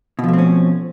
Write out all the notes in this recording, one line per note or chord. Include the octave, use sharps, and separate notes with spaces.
B2 F3 A3 C4 C#4